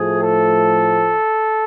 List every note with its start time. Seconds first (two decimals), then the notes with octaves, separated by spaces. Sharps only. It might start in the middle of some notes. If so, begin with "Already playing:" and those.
Already playing: A2 F3 A3 G#4
0.24 A4